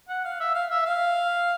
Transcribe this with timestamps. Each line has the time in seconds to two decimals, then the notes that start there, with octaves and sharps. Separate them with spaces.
0.09 F#5
0.25 F5
0.40 E5
0.55 F5
0.71 E5
0.86 F5